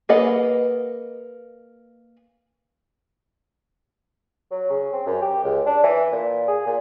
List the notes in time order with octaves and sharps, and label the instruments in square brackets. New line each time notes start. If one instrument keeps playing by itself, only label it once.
[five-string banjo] A#3 G#4 B4 D#5 F#5
[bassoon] F#3
C#3
C4
F#2
G4
C#2
D4
E3
A#2
G#4
A#2